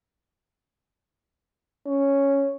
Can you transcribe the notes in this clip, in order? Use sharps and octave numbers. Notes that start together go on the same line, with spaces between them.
C#4